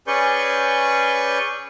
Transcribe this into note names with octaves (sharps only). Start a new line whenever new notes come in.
C#4 G#4 B4 D5 C#6 G6